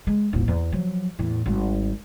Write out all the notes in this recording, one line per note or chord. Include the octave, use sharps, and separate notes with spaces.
G#3
D#1 A1
E2
F3 F#3
E2 A2
G#1 G3